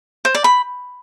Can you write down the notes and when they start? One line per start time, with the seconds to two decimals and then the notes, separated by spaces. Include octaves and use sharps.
0.25 C5
0.35 D5
0.44 B5